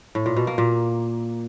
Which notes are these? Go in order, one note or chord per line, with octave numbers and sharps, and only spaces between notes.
A2
A#2
B2
A#3
A#2